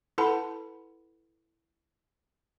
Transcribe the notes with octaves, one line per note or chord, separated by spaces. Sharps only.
E4 A4 B4 F#5 A5 B5